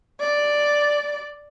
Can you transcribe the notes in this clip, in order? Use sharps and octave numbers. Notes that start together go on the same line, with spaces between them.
D5